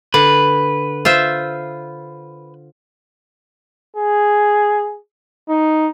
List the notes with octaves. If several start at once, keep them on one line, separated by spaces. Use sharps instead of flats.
D3 B4
F4 C5 E5
G#4
D#4